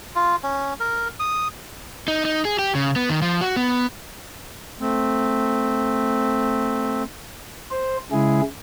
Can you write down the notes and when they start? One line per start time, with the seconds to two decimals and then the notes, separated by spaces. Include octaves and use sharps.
0.15 F4
0.43 C#4
0.80 A#4
1.20 D#6
2.08 D#4
2.25 D#4
2.45 G#4
2.59 G4
2.75 C#3
2.96 B3
3.10 D#3
3.22 F3
3.41 F#4
3.56 B3
4.80 A3 C4
7.71 C5
8.12 C#3 G#3 E4 G#4